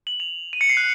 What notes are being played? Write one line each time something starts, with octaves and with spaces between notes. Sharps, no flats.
F#7
F7
D#7
C#7
C7
F#6